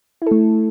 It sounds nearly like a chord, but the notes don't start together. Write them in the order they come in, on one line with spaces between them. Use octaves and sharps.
E4 A4 A3